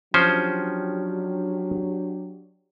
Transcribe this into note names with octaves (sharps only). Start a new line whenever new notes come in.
F3 F#3 C#4 D4 G4 C5